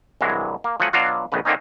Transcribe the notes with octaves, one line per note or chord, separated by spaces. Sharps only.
C2 G2 E3 F#3 G#3
A#3
F3 F#3 A3 F#5 G#5
B2 F#3 D4 F4 F#4
A#1 F2 C#3 B4
D3 D#3 A#3 C4 C#4 D#4